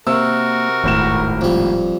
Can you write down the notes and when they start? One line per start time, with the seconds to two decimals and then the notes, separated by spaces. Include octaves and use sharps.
0.07 C3 A#3 F#4 A#4 E6
0.84 D#1 G#1 A2 E7
1.41 F2 G3